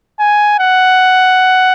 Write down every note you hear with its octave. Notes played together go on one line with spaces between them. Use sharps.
G#5
F#5